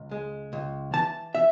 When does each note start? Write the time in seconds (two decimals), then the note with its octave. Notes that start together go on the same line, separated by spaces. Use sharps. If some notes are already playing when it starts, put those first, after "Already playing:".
Already playing: C#2
0.11 G#3
0.53 C#2
0.93 E3 A5
1.35 E5